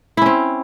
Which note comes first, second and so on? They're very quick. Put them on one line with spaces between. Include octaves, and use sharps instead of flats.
E4 C#4 C4